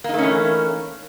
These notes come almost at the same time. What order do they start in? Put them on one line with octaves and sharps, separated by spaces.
A#3 D#4 A3 C#4 E3